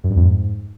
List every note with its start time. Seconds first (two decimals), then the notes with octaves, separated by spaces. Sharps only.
0.04 F#2
0.10 G2
0.16 F2
0.23 G#2